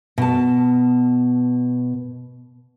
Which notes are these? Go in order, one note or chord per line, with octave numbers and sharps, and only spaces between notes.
B2 A5